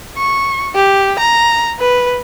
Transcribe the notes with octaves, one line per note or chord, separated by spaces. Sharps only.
C#6
G4
A#5
B4